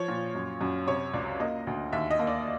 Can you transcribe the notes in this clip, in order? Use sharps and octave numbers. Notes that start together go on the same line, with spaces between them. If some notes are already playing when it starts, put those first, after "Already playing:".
Already playing: F3 C#5
A#2
F#2
F#2
C3 C#5
C#2 D5
A#3 D#5
D2
D#2 E5
D#5
A#3
D5